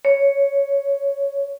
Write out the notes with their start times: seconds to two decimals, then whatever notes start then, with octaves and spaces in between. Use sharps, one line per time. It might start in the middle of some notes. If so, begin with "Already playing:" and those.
0.05 C#5